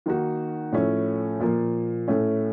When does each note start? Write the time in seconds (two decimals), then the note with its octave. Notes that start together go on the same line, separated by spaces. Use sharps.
0.06 D#3 A#3 D#4 F#4
0.72 A2 F3 A3 C#4
1.40 A#2 F3 A#3
2.08 A2 A3 C#4